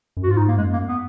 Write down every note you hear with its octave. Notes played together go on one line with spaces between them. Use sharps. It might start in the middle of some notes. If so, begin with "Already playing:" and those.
F#2
F#4
G#2 F4
D#4
A#3
F#2 G#3
A#3
B3